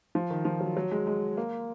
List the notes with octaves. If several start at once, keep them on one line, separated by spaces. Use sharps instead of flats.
F3
D#3
F3
F#3
F#3
G#3
G#3
A#3